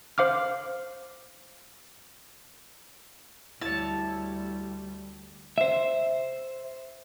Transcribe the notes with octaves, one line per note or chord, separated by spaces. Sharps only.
C5 F5 D6 F6
D2 G3 E4 C#5 A5
C5 E5